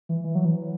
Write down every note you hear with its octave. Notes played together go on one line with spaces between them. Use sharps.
E3
E3
F#3
E3